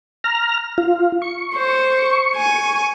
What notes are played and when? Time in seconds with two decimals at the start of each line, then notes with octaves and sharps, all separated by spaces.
0.24 A#5 F6
0.78 F4
1.22 C#6
1.55 C5
2.37 G#5